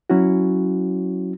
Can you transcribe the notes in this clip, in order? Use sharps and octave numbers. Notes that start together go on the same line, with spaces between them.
F#3 C#4 E4 F#4